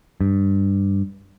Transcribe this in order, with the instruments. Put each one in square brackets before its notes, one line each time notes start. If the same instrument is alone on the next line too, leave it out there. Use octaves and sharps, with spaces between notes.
[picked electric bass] G2